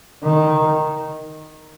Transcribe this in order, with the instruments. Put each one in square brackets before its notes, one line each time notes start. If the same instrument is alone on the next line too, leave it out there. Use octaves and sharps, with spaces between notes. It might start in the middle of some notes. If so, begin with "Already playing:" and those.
[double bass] D#3